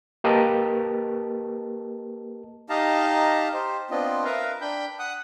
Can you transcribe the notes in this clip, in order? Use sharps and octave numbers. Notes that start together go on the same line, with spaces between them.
A#3 G4 A#4 B4 D#5 A5
D#4 G4 D#5 F5 A5 A#5
G4 C5
B3 C4 D4 F4 D#5
A#4 B4 E5 F5 A#5
D4 G5 B5 G6
F#5 D#6 F#6